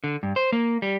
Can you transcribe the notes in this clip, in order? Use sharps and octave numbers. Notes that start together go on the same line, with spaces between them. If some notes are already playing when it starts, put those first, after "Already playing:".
D3
G2
C5
A#3
G3